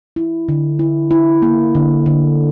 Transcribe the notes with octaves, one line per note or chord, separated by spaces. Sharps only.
E4
D3
E4
E4
A#3
D3
D3